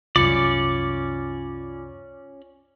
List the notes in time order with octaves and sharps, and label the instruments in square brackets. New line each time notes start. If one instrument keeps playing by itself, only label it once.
[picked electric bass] C2 F#2 [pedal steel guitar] C#4 D5 [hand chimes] F4 D6 C#7